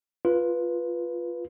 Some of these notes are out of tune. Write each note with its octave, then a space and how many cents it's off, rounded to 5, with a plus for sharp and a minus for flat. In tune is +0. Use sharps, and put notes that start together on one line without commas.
F4 +0 B4 -10